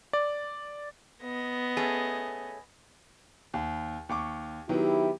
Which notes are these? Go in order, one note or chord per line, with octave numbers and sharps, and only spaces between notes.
D5
B3 D#5
A3 C#4 G#4
D#2
D#2 C#6 D6
D#3 F#3 B3 E4 G4